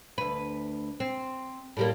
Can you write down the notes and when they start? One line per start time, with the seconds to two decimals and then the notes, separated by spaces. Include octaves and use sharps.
0.18 D2 B4
1.00 C4
1.77 A2 G3 A#3